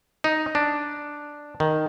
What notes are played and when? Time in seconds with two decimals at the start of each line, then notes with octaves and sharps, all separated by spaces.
0.24 D#4
0.55 D4
1.60 D#3